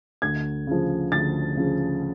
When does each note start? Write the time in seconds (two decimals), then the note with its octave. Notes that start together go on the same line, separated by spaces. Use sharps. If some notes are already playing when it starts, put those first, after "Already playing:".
0.22 D2 G#6
0.67 C#3 F3
1.12 D2 A6
1.57 C#3 F3